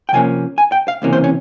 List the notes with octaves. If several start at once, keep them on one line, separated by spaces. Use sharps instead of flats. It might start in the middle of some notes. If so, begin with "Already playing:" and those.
G5
C3 F3 A#3 C#4 G#5
G#5
G5
F5
C#2 C3 E3 A#3 C#4
C5
C#4